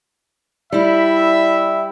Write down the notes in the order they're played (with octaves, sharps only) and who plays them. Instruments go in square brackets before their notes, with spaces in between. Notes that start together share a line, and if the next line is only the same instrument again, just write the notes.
[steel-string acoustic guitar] G3 E4 [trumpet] E5